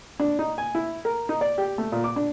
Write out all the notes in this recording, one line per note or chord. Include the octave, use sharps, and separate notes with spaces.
D4
D#4
G#5
E4
A#4
D#4
D5
G4
A3
A#2
D6
D4